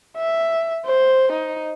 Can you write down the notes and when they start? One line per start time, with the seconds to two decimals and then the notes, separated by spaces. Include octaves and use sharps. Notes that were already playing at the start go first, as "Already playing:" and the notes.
0.17 E5
0.85 C5
1.32 D#4